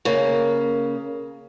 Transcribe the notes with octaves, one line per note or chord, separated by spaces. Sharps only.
C#3 A#3